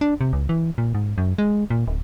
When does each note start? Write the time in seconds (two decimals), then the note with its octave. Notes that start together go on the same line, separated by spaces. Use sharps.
0.01 D4
0.21 C3
0.33 C#2
0.49 E3
0.78 A#2
0.95 G#2
1.18 F#2
1.38 G#3
1.70 A#2
1.88 D1